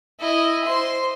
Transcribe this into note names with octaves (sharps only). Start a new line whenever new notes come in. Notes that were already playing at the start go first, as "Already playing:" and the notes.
E4 D#5
C5 C6